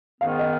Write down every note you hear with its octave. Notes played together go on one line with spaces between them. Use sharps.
G#2 D#3 B3 F5
D#5